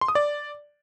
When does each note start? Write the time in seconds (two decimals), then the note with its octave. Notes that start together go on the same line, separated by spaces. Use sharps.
0.01 C6
0.08 D#6
0.15 D5